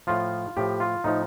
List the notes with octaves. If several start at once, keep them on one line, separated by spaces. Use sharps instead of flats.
A2 F3 F4
A2 F3 G4
F4
A2 F3 D#4